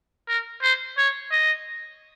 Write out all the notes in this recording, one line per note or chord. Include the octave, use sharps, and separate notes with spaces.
A#4
C5
C#5
D#5